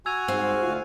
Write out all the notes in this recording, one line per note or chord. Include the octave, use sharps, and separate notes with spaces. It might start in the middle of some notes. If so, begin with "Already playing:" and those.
F#4 G#5 E6 G#6 F7
G#2 C4 F4 F5
D2 F4 F5